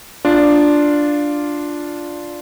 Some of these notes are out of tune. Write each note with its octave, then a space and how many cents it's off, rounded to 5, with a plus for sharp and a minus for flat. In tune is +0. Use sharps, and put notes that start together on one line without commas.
D4 +0 F4 +0